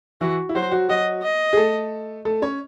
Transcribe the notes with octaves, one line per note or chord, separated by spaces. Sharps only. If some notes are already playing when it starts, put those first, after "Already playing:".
E3 E4 F#4
E4
F#3 F#4 C5
F#3 F#4
F#3 F#4 D#5
D#5
G#4
A3 A4
A3 A4
C#4 C#5